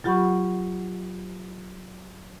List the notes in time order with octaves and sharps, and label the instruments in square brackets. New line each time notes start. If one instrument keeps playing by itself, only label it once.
[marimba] F#3 F4 G4 F#5 B5 C#6